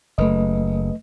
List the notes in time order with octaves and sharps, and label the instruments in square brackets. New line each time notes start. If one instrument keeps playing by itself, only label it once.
[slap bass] F#1 [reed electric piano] A3 B4 D#5